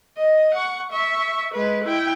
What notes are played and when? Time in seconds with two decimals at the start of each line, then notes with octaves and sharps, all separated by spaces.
0.18 D#5
0.54 F#5 C#6
0.92 E5 C#6
1.53 G#3 B4
1.84 E4 G5